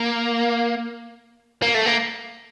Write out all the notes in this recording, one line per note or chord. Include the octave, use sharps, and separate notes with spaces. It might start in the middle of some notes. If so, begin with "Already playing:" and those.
Already playing: A#3
A#3
A3
A#3